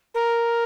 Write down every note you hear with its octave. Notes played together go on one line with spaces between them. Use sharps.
A#4